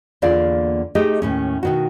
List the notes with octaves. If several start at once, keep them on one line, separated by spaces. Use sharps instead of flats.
E2 D3 A#3 F4 D5 F5
A3 D#4 G4 G#4 D#5
D#2 A2 C#4
B2 D#3 F#4